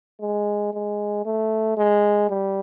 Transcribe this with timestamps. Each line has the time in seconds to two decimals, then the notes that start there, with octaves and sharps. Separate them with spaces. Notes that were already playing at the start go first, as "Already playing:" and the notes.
0.21 G#3
0.74 G#3
1.26 A3
1.77 G#3
2.30 G3